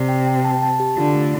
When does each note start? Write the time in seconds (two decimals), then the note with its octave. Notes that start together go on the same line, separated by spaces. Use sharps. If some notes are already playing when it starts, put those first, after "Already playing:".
Already playing: C3 D5
0.09 G5
0.26 G5
0.44 A5
0.62 A5
0.80 G4
0.97 D3 F4
1.15 A3